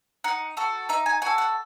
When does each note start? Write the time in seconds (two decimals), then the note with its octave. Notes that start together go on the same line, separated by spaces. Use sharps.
0.24 D#4 F#5
0.57 F#4 A4
0.89 D#4 E5
1.06 G#5
1.22 F#4 A4 G#5
1.38 F#5